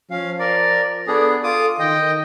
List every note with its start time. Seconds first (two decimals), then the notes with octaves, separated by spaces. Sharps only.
0.11 F3 C#4 F5
0.39 A#4 D5
1.07 B3 D4 G#4 A4
1.44 F4 A4 D6 D#6
1.79 D#3 D#5 G5